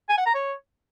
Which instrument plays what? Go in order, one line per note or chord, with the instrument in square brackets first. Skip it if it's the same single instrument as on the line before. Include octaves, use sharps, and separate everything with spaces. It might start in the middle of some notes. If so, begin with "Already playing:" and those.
[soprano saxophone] G#5
F#5
A#5
C#5